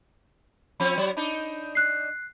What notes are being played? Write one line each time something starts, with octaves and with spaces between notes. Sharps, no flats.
F3 C4 C#4 B5
F#3 C#5
D4 D#4 B5
F#6 C7